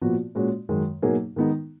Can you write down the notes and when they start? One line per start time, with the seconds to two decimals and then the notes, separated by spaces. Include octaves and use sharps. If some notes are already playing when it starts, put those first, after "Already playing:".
0.01 A#2 F3 B3 F#4
0.35 A#2 G#3 C#4 F#4
0.69 F#2 D#3 G#3
1.02 B2 F#3 A#3 D#4 G#4
1.36 D#3 G#3 B3 D#4